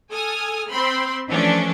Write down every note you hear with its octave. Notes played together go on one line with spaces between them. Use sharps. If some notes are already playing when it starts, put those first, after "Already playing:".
A4 G#5 D#6 F6
C4 B5 C6
E3 F3 A3 C#4 D4